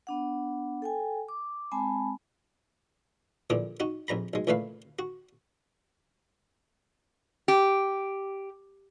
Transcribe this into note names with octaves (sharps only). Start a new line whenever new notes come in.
B3 D4 F#5
A4 G5 G#5
D6
G#3 C4 G#5 A5 B5
A#1 A#2 D3 E3 D6
D#4 F#4
A#1 F2 A#5 B5
B1 G#3
C#2 A#2 E3 A3 B4 F5
F#4
G4